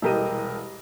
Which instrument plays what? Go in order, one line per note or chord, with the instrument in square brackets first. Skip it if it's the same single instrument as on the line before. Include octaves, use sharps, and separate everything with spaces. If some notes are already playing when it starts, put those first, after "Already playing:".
[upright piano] E1 C2 G4 A#4 D#5 D#7